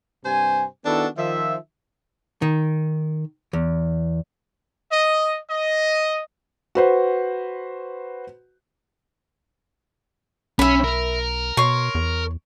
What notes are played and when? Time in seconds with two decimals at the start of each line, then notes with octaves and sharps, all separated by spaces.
0.24 G2 C3 C5 G#5
0.86 D#3 B3 D4 E4 F#4 A4
1.17 D#3 F3 E5
2.42 D#3
3.53 E2
4.91 D#5
5.50 D#5
6.75 F#4 B4 C5
10.59 B1 C#4 E5 B5
10.84 A#4
11.57 B2 C#5 C6
11.95 E2